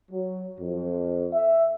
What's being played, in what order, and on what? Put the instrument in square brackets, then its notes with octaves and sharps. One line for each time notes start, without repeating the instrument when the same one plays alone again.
[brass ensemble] F#3
F2
E5